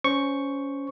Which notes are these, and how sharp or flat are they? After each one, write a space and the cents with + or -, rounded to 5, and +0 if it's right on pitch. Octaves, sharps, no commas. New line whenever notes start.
C#4 +15 C5 -5 C#6 +0